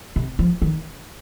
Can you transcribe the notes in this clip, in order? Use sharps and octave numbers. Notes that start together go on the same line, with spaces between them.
C3
F3
D#3